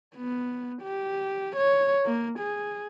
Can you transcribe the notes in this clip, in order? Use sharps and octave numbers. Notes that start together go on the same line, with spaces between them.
B3
G4
C#5
A#3
G#4